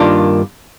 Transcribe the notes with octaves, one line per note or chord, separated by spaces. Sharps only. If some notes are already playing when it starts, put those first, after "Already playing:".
Already playing: G2 D#3 A#3 D4 F4